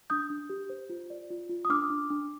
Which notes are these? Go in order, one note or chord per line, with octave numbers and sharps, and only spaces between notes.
D4 D#6 G6
D4
G4
C5
F4
D5
F4
F4
D#6
D4 D6 F6
D4
D4